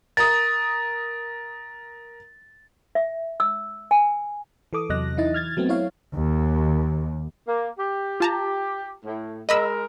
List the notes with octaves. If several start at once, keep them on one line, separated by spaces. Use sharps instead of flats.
A#4 D#6 A6
E5
E6
G#5
E3 A4 D6 D#6
E2 C3 F#3 D#5 F#6 A#6
E3 D#4 E4 D#5 A6
F6 G#6 A6
F#3 A3 B3 C4
E4 C#5 F5
D#2
A#3
G4
F4 A5 A#5
A2
G#3 A#4 D#5 B5 E6